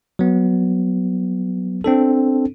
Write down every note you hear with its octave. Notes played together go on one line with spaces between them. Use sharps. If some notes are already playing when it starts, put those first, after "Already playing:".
F#3 B3
C4 D4 A4